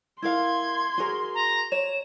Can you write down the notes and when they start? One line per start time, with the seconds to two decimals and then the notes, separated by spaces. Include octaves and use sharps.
0.22 E4 A#4 F5 C6 G#6
0.98 F#4 G#4 A#4
1.35 A#5
1.72 C#5 E7